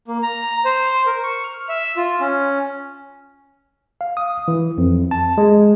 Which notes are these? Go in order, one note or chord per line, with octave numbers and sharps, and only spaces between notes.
A#3
A#5
C5
A#4
C#6
F6
E5
F4
C#4
F5
D#6
E3
F2
A5
G#3